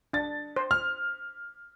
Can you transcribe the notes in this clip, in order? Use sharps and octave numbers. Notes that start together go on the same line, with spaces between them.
D4 A6
C5
F6